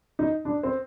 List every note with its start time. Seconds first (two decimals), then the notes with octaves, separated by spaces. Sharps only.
0.19 D#4
0.45 D4
0.63 C4